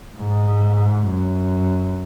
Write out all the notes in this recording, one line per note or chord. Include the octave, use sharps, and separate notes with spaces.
G#2
F#2